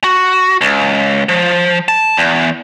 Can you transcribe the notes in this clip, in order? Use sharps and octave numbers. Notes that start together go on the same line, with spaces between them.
F#4
C#2
F3
A5
E2